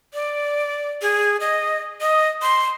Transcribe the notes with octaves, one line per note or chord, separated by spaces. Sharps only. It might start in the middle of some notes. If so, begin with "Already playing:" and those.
D5
G#4
D#5
D#5
C6